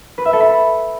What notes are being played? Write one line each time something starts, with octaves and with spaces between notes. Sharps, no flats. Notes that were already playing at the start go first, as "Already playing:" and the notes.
B4
E5
A4
B5